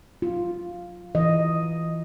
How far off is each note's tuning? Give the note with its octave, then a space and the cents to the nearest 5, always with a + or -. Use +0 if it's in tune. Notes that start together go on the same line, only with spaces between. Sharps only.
F#3 -30 F4 +0
E3 +0 D#5 +0